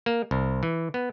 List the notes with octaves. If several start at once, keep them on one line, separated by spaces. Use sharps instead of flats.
A#3
C2
E3
B3